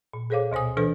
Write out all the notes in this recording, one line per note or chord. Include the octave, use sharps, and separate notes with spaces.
A#2
G#4 A4 C5 C#5 F5 D6
D2 B2 C5 G#5 D#6
E3 D4 A4 B4 C5